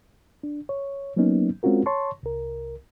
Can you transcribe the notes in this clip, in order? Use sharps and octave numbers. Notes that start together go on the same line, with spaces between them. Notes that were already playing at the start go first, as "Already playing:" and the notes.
D4
C#5
F#3 A#3 B3 C#4 D#4
G#3 C4 C#4 F4 F#4 A#4
C#5 A5 C6 C#6
C2 A#4